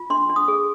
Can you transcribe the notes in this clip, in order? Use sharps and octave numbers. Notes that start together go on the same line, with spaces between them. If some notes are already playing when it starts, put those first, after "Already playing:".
Already playing: F4
D4 C6
D4
D#6
G#4